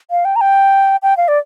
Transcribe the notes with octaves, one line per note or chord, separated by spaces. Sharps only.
F5
G5
A#5
G5
G5
F5
D5